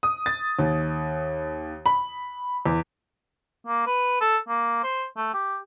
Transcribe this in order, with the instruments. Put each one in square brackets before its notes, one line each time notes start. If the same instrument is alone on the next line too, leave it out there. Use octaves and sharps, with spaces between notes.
[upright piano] D#6
A6
D#2
B5
E2
[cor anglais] A#3
B4
A4
A#3
C5
A3
G4